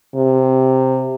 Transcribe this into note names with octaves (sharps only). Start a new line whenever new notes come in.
C3